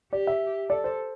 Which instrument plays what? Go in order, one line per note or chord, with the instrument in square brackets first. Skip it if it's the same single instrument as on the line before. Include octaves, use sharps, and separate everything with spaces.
[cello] G4 [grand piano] D5
[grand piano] E5
[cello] A4 [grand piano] D5
[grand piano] C5